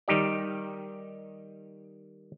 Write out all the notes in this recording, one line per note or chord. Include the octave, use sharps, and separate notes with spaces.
D#3 G3 D#4 G4 D5